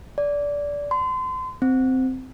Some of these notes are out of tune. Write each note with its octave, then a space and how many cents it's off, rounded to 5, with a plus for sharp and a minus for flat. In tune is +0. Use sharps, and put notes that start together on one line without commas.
D5 -20
C6 -35
C4 -10